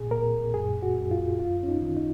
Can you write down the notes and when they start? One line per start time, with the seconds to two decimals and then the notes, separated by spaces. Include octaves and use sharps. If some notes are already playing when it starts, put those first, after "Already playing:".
Already playing: A#2 G#4
0.11 A#2 A#4
0.54 F#2 G#4
0.83 F#4
0.98 F#2
1.11 F4
1.39 F#2 F4
1.63 C#4
1.69 D#4
1.82 D#3
1.97 D#4